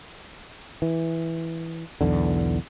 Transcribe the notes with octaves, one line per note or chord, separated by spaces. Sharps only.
E3
B1 E2 D3